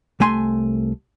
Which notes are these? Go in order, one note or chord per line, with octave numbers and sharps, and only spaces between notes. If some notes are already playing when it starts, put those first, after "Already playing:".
C2 A3 G#5 C6